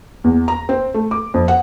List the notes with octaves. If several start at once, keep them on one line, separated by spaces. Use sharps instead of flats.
E2
A#5
C4
A3
D6
F2
F#5